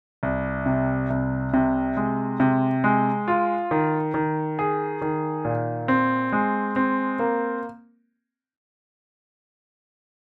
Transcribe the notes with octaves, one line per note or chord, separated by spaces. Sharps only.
C2
C3
C2
C3
G#3
C3
G#3
F4
D#3
D#3
G#4
D#3
A#2
C4
G#3
C4
A#3